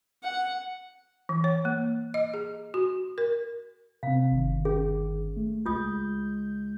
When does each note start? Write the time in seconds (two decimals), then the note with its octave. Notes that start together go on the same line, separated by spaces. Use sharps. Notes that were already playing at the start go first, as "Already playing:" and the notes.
0.23 F#5
1.29 E3
1.44 C#5
1.65 A#3
2.14 D#5
2.34 G#4
2.74 F#4
3.18 A#4
4.03 C3 C4 F5
4.32 G1 D#3
4.65 C#4 G#4
5.36 A3
5.66 C#2 G#3 F4 D#6 G6